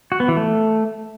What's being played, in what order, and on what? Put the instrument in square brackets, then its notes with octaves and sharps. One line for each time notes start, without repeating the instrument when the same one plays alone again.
[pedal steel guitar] F#4
B3
E3
A3